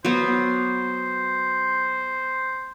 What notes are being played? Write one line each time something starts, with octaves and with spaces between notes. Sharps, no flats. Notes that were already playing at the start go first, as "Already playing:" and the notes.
F#3 B3 C5